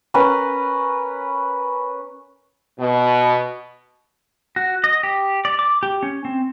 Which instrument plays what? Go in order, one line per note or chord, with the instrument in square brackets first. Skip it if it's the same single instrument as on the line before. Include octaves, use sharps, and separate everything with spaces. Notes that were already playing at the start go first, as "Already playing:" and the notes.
[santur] C#4 A#4 B4
[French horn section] B2
[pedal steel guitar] F#4
D#5
G4
D5
D6
G4
C#4
C4